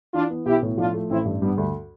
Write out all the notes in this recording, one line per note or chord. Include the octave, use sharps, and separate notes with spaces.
E3 D4 F4
B3
B1 E4 G4
A2
F3 D4 F4
A3
A1 C4 E4
G2
G3 B3 D4
D2